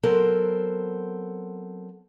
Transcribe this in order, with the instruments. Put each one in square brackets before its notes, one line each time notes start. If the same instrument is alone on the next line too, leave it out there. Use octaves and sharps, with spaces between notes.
[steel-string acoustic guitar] F#3 B3 C4 A4 A#4 C5